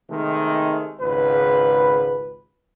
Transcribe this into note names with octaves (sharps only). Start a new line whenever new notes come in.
C3 D#3 G#3 A3
G#1 C#2 B4